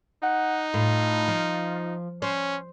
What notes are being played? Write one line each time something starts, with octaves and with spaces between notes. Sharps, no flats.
D#4 F#5
A2 F4
F3
C#4 C5